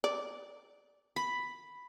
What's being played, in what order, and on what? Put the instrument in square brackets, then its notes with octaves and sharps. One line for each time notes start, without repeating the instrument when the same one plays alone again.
[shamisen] D5
[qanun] B5